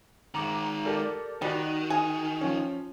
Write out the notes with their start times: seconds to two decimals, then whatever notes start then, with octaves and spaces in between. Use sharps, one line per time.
0.34 D#3 G#3 A#5 D6
0.85 G4 A4 A#4 D5
1.42 D#3 G3 D#4 F#4
1.90 G#4
2.41 F3 C#4